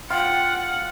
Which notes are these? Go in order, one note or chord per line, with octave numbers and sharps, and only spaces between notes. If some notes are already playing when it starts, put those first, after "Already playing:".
F4 F#5 G5